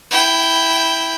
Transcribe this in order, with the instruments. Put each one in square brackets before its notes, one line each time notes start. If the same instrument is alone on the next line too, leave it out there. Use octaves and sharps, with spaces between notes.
[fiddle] E4 G5